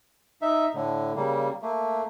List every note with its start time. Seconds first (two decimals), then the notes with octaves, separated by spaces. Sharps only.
0.42 D#4 E5
0.75 A2 D3
1.16 C#3 G3 A#3
1.62 A3 A#3